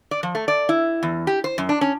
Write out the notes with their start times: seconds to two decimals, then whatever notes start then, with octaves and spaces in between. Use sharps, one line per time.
0.11 D5
0.23 F3
0.35 A3
0.48 D5
0.69 E4
1.03 E2
1.27 G4
1.44 C5
1.58 F#2
1.69 D4
1.81 C#4